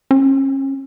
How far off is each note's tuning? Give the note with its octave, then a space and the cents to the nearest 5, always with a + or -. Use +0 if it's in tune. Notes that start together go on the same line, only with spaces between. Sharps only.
C#4 -35